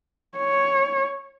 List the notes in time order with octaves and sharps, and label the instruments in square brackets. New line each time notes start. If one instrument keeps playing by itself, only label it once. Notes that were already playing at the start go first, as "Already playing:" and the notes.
[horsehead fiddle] C#5